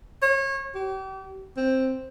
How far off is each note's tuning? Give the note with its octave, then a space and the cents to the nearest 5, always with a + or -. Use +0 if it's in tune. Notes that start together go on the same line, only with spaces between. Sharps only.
C#5 -30
G4 -35
C4 +5